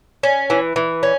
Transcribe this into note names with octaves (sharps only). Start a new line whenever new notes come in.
C#4
E3
E3
C#4